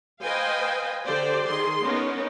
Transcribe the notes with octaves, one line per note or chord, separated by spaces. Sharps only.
B4 C5 D#5 F5 G5 G#5
D3 G4 C5 D5
D#3 G#4 C6
B3 C#4 D#4 A#4